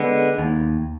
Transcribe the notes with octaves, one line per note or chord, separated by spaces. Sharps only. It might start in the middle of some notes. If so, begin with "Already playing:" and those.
Already playing: D3 G#3 B3
D#2